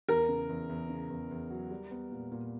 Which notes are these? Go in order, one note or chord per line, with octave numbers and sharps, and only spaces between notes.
E2 A#4
C#3
E2
E2
C#3
E2
E2
F#3
G3
B3
A#2
A#2